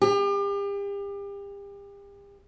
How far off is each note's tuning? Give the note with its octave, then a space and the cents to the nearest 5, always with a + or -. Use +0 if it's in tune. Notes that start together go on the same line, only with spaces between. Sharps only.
G4 +35